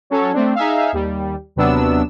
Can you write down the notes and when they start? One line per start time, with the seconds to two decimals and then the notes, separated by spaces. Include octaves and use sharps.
0.10 F#3 C#4 A4 C#5
0.33 A3 C4 D4
0.55 D#4 G#4 E5 F5
0.92 D#2 G3
1.56 D#2 C3 F#3 B3 D4 E6